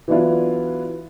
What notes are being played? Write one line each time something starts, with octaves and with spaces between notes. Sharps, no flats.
E3 F#3 B3 D4 E4 F4